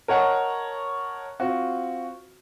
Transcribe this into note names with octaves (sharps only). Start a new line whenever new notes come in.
A#4 C#5 D#5 F#5 A5
C4 F4 F#4